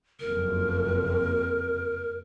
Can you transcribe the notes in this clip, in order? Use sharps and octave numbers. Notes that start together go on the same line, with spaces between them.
F#1 F2 A#4